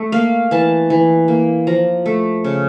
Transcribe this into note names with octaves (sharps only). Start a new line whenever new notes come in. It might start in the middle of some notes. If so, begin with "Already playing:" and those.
Already playing: A3
A#3 F5
E3 A5
E3
A#3
F3 A#5
A3
C#3